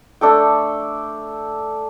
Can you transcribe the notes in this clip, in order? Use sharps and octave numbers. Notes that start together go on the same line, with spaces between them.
A3 D4 A4 G5